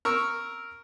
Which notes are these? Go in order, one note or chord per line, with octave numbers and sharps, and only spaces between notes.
A#4 C#6 E6